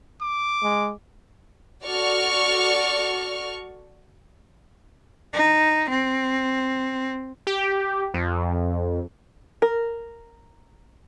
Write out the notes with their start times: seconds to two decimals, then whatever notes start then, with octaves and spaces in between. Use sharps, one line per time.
0.21 D6
0.63 G#3
1.84 F#4 A4 D5 C#6 F6
5.33 D#4
5.89 C4
7.47 G4
8.14 F2
9.62 A#4